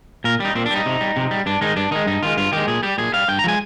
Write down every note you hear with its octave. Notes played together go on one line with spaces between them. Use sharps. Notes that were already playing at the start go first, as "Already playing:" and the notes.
A#2 A#4
G3 D#4
A#2 C4
D4
G3 D#4
C3
G3
C3
G3
G2 D4
D#3 G#3 D#4
G2 D4
D#3 G#3 D#4
G2 D#4
D#3 G#3 F4
G2 F4
D#3 G#3 G4
A#2 G#4
G3 G4
A#2 G#4
G3 F5
G2 G5
A#5
F3 G#3 G#5